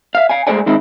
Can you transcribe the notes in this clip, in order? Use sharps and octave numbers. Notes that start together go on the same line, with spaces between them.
E5 F5
F5 G#5
G#3 A3 A4 C5 D5 G#5
D#3 G#3 C4 D#4 E4